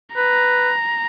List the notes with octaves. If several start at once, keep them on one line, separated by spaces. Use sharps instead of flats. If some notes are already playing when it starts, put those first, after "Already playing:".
B4 A#5